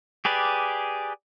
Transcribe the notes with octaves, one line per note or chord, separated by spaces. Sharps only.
G4 G#4 B4 D5